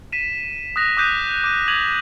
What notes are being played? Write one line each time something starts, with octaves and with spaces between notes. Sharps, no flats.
B6 D#7 E7
D#6 F#6 A#6 F7
D6 D#6 F#6 G6 B6 D#7
D6 D#7
D6 G#6 D#7 F7 F#7